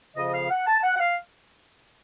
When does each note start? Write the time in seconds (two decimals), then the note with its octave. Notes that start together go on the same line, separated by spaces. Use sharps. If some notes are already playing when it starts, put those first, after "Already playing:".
0.16 F2 C#3 F3 D#5
0.33 F5
0.50 F#5
0.67 A5
0.78 A5
0.83 F#5
0.96 F#5
1.00 F5